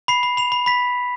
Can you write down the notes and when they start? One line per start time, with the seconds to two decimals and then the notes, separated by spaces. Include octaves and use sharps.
0.08 B5 C7
0.23 B5
0.37 B5 F7
0.52 B5
0.66 B5 B6